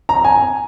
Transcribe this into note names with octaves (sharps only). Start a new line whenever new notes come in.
A#5
G#5